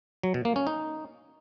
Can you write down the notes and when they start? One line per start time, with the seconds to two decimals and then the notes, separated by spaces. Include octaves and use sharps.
0.23 F#3
0.34 B2
0.45 A#3
0.56 C#4
0.67 D#4